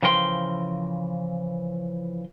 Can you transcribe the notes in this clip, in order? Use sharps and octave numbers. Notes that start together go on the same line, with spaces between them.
C#3 E3 F3 A#4 G5 C6